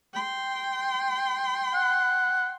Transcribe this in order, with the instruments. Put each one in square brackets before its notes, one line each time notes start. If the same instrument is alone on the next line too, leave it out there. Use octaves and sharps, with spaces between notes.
[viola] G5 C6
[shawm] F#5